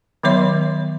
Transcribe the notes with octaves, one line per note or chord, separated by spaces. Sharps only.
D#3 F#3 B3 C#5 E5 C6